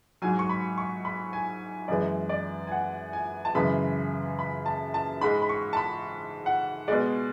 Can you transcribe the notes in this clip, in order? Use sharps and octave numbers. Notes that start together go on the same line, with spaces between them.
G#2 F#3 G#5
C#6
B5
C#6
B5
G#5
F#2 E3 G#3 D5
D5
G#5
F#5
G#5
A5
F#2 C#3 E3 G#3 B5
B5
A5
A5
G#2 G#3 B5
B5
C#6
A5
B5
F#5
B2 G#3 D5